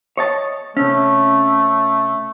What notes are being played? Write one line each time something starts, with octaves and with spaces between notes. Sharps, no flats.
C#5 D#5 A5
C3 A3 C#4